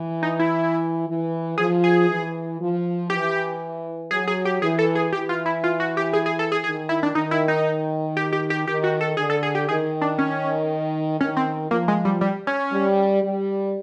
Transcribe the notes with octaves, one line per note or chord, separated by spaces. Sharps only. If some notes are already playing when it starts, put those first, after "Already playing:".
Already playing: E3
D#4
E4
E3
F3 G#4
G#4
E3
F3
E3 G4
F#3 G#4
G#4
G4
E3 G#4
A4
G#4
E3 G4
F4
E4
F4
F#4
G4
G#4
G#4
A4
G#4
D#3 G#4
E4
D4
D#3 D#4
E4
D#4
G4
G4
G4
D#3 G4
F#4
A4
D3 G#4
A4
G#4
G4
D#3 G#4
D4
C#4
D#3 C#4
C4
F3 A#3
G#3
G3
G3
C#4
G3
G3